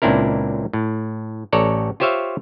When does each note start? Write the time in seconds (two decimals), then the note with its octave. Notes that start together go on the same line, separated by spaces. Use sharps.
0.02 C#2 A#2 C4 D4 E4 A#4
0.73 A2
1.53 A1 A4 C#5 D5 A#5
2.00 F4 G4 C5 C#5 E5 F5